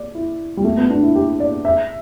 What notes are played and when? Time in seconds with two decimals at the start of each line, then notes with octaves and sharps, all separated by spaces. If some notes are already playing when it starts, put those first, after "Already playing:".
Already playing: D5
0.15 E4
0.57 G3
0.64 A3
0.77 B3
0.90 D4
1.03 E4
1.15 G4
1.40 D5
1.65 E5